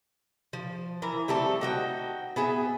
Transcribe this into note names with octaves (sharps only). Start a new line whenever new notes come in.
F3
E3 A#4
G3 A3 C4 A4
D#4 F#4 G5
B3 G#4 E5